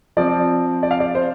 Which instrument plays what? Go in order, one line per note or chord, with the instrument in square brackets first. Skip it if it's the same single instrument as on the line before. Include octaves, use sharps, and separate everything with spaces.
[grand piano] F3 C4 D5
D5
F5
D5
C5